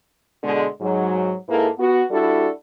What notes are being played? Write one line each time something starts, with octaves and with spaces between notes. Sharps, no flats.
B2 D3 G#3
G#2 F#3
G#2 A#3 E4 A4 B4
B3 F#4
G3 D4 E4 F#4 A4